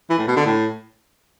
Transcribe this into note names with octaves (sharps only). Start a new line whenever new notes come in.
E3
A2
B2
D3
A2